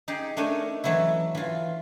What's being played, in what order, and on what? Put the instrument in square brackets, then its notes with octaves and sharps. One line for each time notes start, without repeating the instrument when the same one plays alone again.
[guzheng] D#4 G4 G#4
A3 D4 D#4 A#4 C#5 G#5
E3 F#3 A3 E4
E3 F4